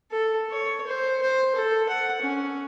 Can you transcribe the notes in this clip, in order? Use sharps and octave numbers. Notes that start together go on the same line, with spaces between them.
A4
C#5
C5
C5
A4
F#5
C#4